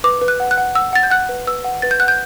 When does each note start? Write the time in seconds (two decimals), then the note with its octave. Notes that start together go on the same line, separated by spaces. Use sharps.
0.04 B4 D6
0.22 B4
0.28 F#6
0.40 F#5
0.51 F#6
0.58 F#5
0.75 F#5 E6
0.93 F#5 A6
1.03 G6
1.11 F#5 F#6
1.29 B4
1.47 B4 E6
1.64 F#5
1.82 B4 A6
1.91 G6
2.00 F#5 F#6
2.08 G6